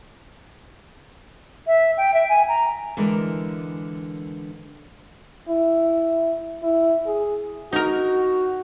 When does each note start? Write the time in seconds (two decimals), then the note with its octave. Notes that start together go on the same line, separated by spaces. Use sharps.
1.67 E5
1.97 G5
2.14 E5
2.29 G#5
2.48 A#5
2.97 D3 E3 G#3 D4 A#4
5.49 E4
6.63 E4
7.06 G#4
7.73 D#4 F#4 A#4